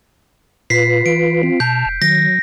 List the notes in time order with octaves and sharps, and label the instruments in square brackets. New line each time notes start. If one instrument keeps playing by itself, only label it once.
[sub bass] A#2 [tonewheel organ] F4 B4 [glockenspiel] B6 C7
[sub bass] E3 [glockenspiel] D7
[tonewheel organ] C4 F4
[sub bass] B2 [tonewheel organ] A5 F6 [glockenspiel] G6
[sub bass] F1
[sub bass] D#3 [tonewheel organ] F#3 [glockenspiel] A#6